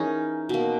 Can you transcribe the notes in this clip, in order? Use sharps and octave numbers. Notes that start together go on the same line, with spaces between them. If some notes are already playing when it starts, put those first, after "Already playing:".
Already playing: E3 C#4 D#4 G#4 A#4
B2 A#3